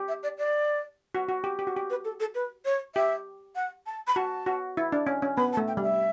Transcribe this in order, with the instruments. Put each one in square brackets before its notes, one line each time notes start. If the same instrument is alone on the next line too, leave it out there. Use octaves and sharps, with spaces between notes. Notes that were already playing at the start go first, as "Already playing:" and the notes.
Already playing: [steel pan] G4
[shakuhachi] E5
D5
D5
[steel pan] F#4
F#4
G4
G4
F#4
G4
[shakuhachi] B4
A4
A4
B4
C#5
[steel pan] G4 [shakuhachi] E5
[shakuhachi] F#5
A5
B5
[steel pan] F#4 [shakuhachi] A5
[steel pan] F#4
E4
D4
C#4
C#4
[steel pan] B3 [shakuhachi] B5
[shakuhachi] A5
[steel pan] A3
[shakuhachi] G5
[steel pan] G3
[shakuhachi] E5